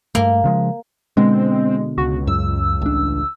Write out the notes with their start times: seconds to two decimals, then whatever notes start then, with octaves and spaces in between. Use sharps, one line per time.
0.15 G2 A3 A#3
0.44 C#3 F3 G#3
1.17 B2 D3 G#3 C4
1.98 C#2 F#4
2.27 F#2 E6
2.82 A1 D4